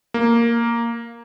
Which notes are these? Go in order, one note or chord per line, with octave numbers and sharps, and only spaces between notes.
A#3